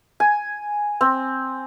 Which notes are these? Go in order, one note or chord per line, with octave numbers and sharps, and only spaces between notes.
G#5
C4